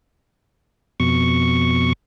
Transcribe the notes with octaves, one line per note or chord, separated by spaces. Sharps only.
F2 B2 C#6